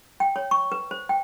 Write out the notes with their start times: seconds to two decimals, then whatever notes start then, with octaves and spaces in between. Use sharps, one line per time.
0.20 G5
0.36 C#5
0.51 C#6
0.72 B4
0.91 C5
1.09 G5